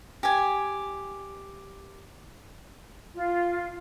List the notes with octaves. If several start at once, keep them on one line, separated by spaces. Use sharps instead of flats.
G4 G#5
F4